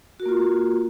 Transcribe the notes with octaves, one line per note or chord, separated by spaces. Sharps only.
A#3 F4 F#4 A#4